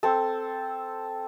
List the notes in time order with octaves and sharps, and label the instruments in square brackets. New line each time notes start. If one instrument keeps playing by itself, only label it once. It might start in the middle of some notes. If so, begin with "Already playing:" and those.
[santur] C4 A4